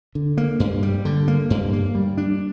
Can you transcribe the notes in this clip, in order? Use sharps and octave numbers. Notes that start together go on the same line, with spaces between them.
D3
A#3
G2
G3
D3
A#3
G2
A#3
G3
D4